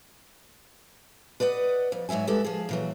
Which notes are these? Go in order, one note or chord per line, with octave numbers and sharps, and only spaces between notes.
B4 D5 D#5 F#5
F2
G#2 F#3 E4 E5 G#5
G#3 E4 G4 A4 B4
F3 G#4
A#2 E3 F#3